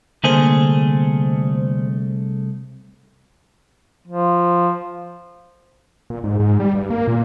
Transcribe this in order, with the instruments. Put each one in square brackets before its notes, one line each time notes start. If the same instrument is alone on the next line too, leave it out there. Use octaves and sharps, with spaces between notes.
[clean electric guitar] C2 A3 G#4 [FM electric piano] D3 A#3 C5
[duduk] F3
[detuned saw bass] A#2
G#2
G#2
G3
G2
A#3
A#2